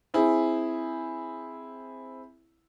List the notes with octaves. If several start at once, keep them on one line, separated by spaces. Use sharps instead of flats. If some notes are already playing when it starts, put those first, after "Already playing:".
C4 E4 G#4